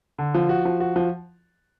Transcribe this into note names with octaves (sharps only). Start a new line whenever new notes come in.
D3
F3
F#4
F3
F#4
F3